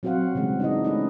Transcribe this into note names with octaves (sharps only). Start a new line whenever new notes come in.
F#3 C4 F#4 C5 F5 F#5
C#3 E3 G3 G#3
D4 D#4 D#5
G#3 A3 C#4 D#4 B4 D#5